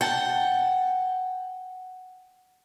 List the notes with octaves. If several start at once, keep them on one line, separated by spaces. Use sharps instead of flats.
F#5 G5 A5